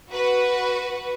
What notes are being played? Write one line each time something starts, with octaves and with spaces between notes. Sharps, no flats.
F#4 B4